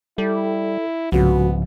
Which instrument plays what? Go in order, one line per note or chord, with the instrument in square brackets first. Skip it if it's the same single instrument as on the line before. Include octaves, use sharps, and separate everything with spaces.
[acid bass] G3 [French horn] E4 [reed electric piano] A4
[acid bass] C2 [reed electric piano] G#2 C#3 F3 [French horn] B3 [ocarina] F#4